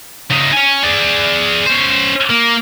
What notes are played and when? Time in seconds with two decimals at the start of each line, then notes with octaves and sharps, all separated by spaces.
0.31 C#3 D#4
0.53 C#5 G#5
0.83 G#4 D5
1.66 C#4 C5
2.30 A#3